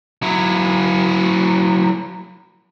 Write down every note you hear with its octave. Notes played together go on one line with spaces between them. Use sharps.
F#3 E4